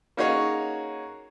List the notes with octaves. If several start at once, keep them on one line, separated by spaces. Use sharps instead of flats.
A#3 C#4 D#4 F#4 G#4 C#5